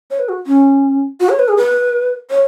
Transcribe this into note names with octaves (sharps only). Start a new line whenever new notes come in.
C#5
B4
F#4
C#4
F#4
C#5
B4
G#4
B4
C#5